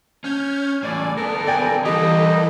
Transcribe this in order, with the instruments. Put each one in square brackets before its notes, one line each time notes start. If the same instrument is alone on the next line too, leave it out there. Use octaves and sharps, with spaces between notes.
[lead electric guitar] C#4 [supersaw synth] F6 G6 G#6
[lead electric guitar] E2 A2 [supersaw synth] D5 G#5
[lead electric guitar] D2 B3 [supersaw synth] A4 [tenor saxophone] A#4
[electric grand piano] D5 G5 G#5
[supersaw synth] E3 A4 [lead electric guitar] G3 A#4 [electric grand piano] G4 [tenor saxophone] D#5